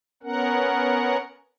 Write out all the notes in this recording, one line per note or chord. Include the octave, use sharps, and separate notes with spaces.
B3 C#4 A#4 F#5